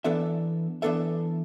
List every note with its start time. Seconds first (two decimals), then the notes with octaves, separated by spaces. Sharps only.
0.04 E3 B3 D4 A4 E5
0.82 E3 B3 D4 A4 E5